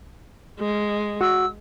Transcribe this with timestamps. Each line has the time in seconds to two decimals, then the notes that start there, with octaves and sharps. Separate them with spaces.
0.59 G#3
1.21 F#4 E6